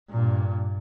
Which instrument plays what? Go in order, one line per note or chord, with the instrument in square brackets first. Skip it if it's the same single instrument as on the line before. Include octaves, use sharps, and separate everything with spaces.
[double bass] G2 A#2